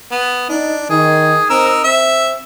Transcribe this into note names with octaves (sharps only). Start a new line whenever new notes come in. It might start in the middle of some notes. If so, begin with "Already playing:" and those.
B3
D4 D#4
D#3 G#4
C4 D#4 A#4 E6
C4 E5